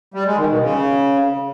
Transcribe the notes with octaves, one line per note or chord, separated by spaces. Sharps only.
G3
G#3
D#3
B2
C#3